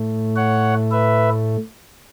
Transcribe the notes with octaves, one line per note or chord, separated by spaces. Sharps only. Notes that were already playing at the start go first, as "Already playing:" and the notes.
Already playing: A2 A3
C#5 F#5
B4 E5